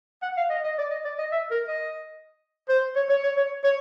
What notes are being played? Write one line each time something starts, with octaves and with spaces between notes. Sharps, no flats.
F#5
F5
D#5
D#5
D5
D#5
D5
D#5
E5
A#4
D#5
C5
C#5
C#5
C#5
C#5
C#5